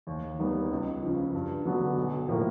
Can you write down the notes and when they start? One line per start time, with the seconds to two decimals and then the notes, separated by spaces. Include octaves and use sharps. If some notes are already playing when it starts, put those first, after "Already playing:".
0.07 D#2
0.38 D#3 G3 B3
0.71 C#2
1.03 C#3 F3
1.34 G2
1.65 D3 F#3 B3 D4
1.97 B1
2.28 A2 F3 A#3